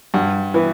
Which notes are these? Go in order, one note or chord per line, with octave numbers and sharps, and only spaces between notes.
G2 F#5
E3 B3